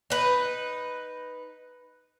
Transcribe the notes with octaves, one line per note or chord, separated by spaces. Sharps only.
D#4 B4